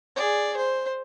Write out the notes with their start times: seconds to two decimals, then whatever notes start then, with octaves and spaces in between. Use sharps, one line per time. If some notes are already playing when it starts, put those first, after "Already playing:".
0.16 G#4 D5
0.57 C5